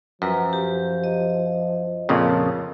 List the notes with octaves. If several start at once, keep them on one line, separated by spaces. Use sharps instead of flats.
F#2 F3 B4 A#5
G4
D#5
F2 A#2 C#3